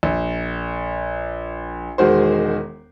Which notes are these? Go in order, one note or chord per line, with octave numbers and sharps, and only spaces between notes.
A#1
E1 D#3 G#3 F#4 C5